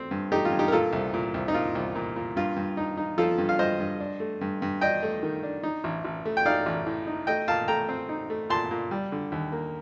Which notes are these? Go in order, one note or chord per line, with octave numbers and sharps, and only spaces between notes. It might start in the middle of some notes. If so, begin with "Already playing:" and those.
Already playing: A3 C4
G2
A3 D#4 G4
F4
G2
D#4 G4
A#4
A#2 F4 A4
C2
A#2
C2
D#4
A#2 F4
C2
A#2
A#2
G2 F4
G2
D#4
D#4
F3 F4 A4
G2
F5
G2 C5 D#5
G2
D4
A3
G2
G2
D4 D#5 G5
A3
D#3
D4
D#4
A1
A1
A3
G5
D#4 D5 F5
A1
A2
D#4
A3 D#5 G5
A#2 F5 A5
A3 G5 A#5
C4
D#4
A3
A#2 A5 C6
A#2
G3
D3
D#2
A#3